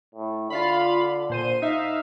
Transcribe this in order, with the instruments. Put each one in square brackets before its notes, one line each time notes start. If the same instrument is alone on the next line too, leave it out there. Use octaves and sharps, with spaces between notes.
[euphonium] A2
[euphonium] D3 [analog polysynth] F4 F5 B5
[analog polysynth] A#2 C5 D#7
D#4 E5 F5